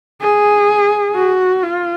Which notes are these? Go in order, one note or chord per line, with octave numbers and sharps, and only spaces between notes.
G#4
F#4
F4